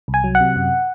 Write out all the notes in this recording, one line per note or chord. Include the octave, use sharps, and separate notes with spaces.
C2
G#5
F#3
F#5
C3
F#2